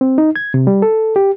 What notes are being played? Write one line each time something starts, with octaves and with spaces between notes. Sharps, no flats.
C4
D#4
G#6
C3
G3
A4
G4